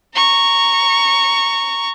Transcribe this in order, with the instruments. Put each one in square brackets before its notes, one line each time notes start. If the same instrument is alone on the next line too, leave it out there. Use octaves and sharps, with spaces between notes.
[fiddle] A#5 C#6